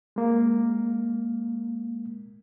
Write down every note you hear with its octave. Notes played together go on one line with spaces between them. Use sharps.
G#3 A#3